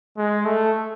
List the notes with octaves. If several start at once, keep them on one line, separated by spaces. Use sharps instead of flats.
G#3
A3